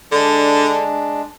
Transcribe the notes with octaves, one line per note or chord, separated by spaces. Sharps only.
D3 G#3 D4